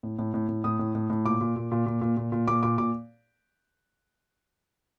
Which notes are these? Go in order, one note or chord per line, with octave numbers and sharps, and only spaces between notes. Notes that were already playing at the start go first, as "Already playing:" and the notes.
A2
A2
A2
A2
A2 D#6
A2
A2
A2
A#2 D6
A#2
A#2
A#2
A#2
A#2
A#2
A#2
A#2 D6
A#2 D6
A#2 D6